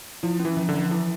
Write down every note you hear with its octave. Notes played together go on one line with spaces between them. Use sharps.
F3 E4
C#4
E3
F3
D3
F3
E3 E4